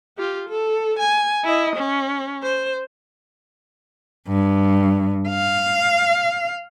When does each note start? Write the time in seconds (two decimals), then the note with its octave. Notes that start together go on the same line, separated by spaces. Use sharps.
0.18 F4 G4
0.49 A4
0.99 G#5
1.44 E4 D#5
1.76 C#4
2.43 C5
4.28 G2
5.29 F5